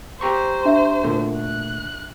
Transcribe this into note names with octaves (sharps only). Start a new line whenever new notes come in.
G4 C5 A#5 C#6
D4 E5
A#2 D3 A3
F#6